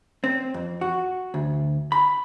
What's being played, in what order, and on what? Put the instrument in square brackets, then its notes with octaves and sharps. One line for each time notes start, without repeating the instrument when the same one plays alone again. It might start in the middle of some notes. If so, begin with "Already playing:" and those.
[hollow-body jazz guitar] C4
F2
F#4
D2
B5